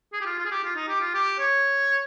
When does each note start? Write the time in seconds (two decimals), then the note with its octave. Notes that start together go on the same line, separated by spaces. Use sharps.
0.13 G#4
0.21 G4
0.26 F4
0.38 F4
0.45 G#4
0.51 G4
0.64 F4
0.76 D#4
0.88 G4
1.01 F4
1.14 G4
1.39 C#5